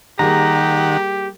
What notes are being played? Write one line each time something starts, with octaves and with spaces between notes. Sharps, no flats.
D#3 G3 A#3 G4 G#4 F#5 A#5